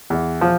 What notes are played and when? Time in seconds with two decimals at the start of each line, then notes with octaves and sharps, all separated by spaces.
0.10 E2
0.41 F3